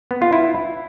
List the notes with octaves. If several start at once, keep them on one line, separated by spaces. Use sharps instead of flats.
B3
F4
E4